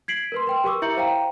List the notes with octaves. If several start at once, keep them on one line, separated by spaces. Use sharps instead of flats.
G#6 B6 C7 D7 F#7
A#4 B4 C6
B4 G5 C6
G4 A#4 C#6 D6 E6
E4 E5 A#5 G6 C#7 F#7
C5 F5 G5 A#5